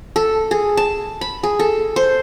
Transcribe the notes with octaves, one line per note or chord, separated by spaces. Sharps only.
A4
G#4
A5
B5
G#4
A4
C5